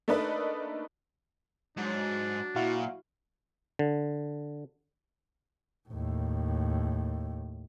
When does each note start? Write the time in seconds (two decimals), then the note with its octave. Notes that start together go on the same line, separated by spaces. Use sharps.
0.08 A3 A#3 D4 D#4 B4 D#5
1.77 G#2 F#3 D4
2.56 A#2 E4 F#4 F5
3.79 D3
5.89 D#2 A2